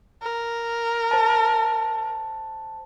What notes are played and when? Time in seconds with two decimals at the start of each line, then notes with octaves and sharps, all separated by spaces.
0.22 A#4
1.11 C5 A5